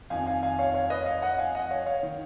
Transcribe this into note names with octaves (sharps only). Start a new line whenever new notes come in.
F2 D#3 F5 G#5
F5 G#5
F5 G#5
C#5 F5
C#5 F5
B4 D#5
C#5 F5
D#5 F#5
F5 G#5
D#5 F#5
C#5 F5
C#5 F5
D#3